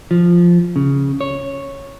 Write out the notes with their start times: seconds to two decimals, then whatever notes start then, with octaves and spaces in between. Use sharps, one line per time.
0.11 F3
0.76 C#3
1.21 C#5